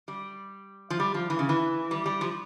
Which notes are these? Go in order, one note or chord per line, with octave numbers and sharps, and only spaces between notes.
G3
F3
G3
F3
E3
C#3
E3
G3
G3
F3